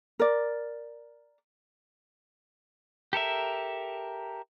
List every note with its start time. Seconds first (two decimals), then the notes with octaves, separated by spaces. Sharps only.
0.19 A#4 D5
3.13 G4 A4 A#4 E5